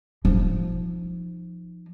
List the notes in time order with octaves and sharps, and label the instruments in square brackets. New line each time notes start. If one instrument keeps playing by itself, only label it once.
[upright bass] F3 D#4